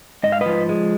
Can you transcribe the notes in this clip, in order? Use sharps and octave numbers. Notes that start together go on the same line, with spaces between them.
G#2 D#5
F5
F3 B4 D#5
G#3